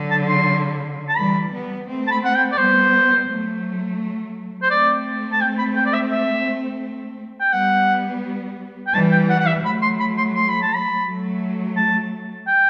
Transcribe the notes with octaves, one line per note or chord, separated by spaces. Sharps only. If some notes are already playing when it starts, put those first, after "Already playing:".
Already playing: D3 F#3
A5
C6
A5
E3 G3 B5
G3 B3
A3 C4
A5
B5
F#5
G5
D5
G3 B3 C5
F#3 A3
C5
A3 C4 D5
A5
G5
B5
G5
D5
E5
E5
G5
G3 B3 F#5
G5
E3 G3 A5
G5
F#5
F#5
E5
F#3 A3 B5
C6
B5
C6
C6
B5
A5
B5
F#3 A3
A5
G5